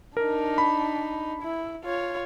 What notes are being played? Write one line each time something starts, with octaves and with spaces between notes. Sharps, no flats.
D4 D#4 A#4
B5
E4
F4 C#5